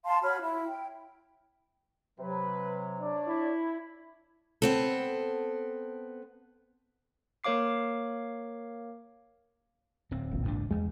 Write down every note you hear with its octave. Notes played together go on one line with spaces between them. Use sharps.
F5 A5 C6
F#4 C#5 B5 F6
E4
G5
C3 F#3 B4
D4 C#5 D5
E4
B3 C4 A4
A#3 A#4 C#5 F5 D6 C7
D1 C4
E1 A#1
C#2 G#2 D4
E2 G#3